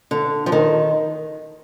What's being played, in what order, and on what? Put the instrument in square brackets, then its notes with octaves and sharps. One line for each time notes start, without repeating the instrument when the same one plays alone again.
[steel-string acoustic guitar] D3
F3
D#3